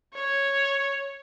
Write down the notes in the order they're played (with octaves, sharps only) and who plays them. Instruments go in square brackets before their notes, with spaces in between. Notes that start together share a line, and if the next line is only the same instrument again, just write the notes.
[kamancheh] C#5